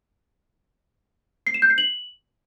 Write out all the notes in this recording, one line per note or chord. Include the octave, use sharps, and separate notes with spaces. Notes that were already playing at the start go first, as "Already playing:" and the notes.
C7
E7
G6
C7
F#7